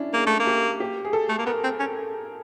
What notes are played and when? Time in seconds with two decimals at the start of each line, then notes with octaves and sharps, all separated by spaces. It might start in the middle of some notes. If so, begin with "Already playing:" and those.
Already playing: C#4 D4 E4
0.13 A#3 G#4
0.27 A3
0.40 A#3
0.47 G4
0.80 G4
1.05 G#4
1.13 A4
1.29 A3
1.38 A#3
1.46 B3 A#4
1.64 C4
1.80 C#4